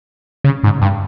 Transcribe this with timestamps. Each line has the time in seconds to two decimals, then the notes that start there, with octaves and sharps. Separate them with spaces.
0.44 C#3
0.64 G#2
0.82 G2